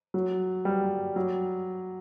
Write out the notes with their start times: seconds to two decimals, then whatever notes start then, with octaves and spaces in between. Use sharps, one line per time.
0.14 F#3
0.65 G3
1.16 F#3